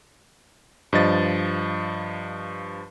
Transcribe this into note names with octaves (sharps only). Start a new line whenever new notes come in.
G2 F3 D#5 A6